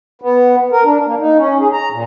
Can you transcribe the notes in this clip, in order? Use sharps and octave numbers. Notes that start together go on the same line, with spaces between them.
B3
A#4
D4
A#3
D#4
C#4
G#4
A#5
A#2